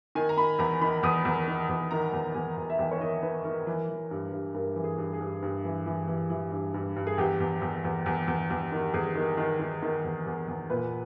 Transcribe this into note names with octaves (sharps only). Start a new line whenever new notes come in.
D#3 G#5
A#5
D#3 B5
E2 A#5
D#3 B5
E2 D#6
E2
D#3
E2
D#3 A#5
E2
E2 G#5
E2
E5
E2 G5
C#5
D#3 D#5
D#3 B4
D#3 A#4
E3
E3
G2
G2
G2 A#4
E3
G#4
G2
G#4
G2
G2
E3
E3
E3
E3
G2
G2
G2
G#4
E2 G4
E2
E2
E2
E2
E2
E2
D#3
E2 G#4
D#3
D#3
D#3
D#3
E2
E2
E2
A#2 B4